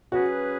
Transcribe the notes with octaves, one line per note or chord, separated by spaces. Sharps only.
F#3 C#4 F#4 G#4 B4